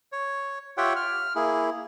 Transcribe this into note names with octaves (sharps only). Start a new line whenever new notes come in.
C#5
F4 G4 C#5 E5 F#5 G5
F6
A#3 E4 G#4